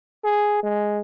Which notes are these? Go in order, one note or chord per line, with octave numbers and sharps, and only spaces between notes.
G#4
G#3